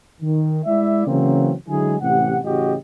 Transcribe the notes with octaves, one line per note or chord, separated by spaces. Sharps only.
D#3
G#3 E4 D5 E5
C#3 E3 F#3 A#3 C4 C#4
D3 F#3 G#3 E4 G#4
A1 C3 G4 F#5
A1 A2 C#3 F#4 G4 D#5